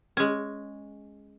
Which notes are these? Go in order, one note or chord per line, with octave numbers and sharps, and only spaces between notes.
G#3 C#4